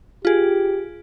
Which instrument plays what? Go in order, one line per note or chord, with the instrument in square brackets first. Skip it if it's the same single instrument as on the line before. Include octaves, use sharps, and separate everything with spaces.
[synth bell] F4 G#4 [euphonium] G4